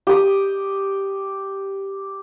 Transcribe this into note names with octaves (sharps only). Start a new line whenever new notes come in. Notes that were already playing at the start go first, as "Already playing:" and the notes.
G4 D#6